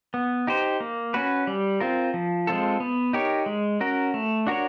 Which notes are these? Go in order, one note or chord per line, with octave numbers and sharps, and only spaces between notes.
B3
D#4 G4 C5
A#3
C#4 F#4 B4
G3
C4 F4 A#4
F3
G#3 C4 F4 A4
B3
D#4 G4 A#4 C#5
G#3
C#4 F#4 A#4
A3
D4 F#4 A#4 C#5